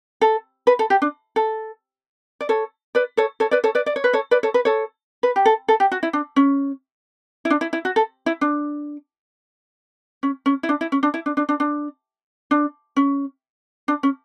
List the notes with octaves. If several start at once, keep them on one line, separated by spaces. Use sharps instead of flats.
A4
B4
A4
G4
D4
A4
D5
A4 C#5
B4 D5
A4 C#5
A4 C#5
B4 D5
A4 C#5
B4 D5
D5
C#5
B4
A4 C#5
B4 D5
A4 C#5
B4
A4 C#5
B4
G4
A4
A4
G4
F#4
E4
D4
C#4
E4
D4
E4
E4
F#4
A4
E4
D4
C#4
C#4
E4
D4
E4
C#4
D4
E4
D4
D4
D4
D4
D4
C#4
D4
C#4